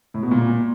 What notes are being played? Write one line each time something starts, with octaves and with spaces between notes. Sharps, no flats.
A2
B2
A#2